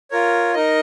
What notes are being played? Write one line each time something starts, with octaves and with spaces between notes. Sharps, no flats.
F4 A#4 C#5
D#4 A#4 D#5